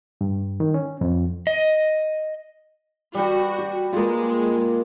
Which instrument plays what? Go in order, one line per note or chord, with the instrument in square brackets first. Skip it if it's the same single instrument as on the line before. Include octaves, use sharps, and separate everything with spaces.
[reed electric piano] G2
D#3
C#4
F2
[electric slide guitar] D#5
[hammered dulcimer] G3 G5 [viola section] F#4
[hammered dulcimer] G4
[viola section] G#3 [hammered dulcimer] A#3 F4